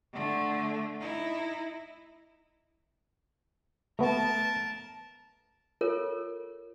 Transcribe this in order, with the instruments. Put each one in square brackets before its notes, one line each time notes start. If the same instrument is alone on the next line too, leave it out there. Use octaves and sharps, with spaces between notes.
[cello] D3 A3
D#4 E4
[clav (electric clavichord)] A3 B3 [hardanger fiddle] A#4 A5
[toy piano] F4 A4 A#4 C#5